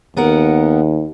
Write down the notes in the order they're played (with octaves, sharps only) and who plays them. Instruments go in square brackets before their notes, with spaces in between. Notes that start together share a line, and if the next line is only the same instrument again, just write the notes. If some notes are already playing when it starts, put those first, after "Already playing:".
[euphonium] D#2 [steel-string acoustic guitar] B3 A#4 F#5